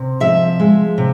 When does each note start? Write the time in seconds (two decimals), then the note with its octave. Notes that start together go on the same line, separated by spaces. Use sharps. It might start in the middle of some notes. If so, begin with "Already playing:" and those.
Already playing: C3
0.20 F3 E5
0.60 G#3
0.98 C3